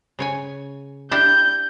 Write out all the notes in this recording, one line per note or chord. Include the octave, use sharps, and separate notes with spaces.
C#3 C#5 G#5
D4 E4 G4 G6